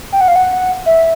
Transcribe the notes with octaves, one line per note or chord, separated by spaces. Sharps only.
G5
F#5
F5
F#5
E5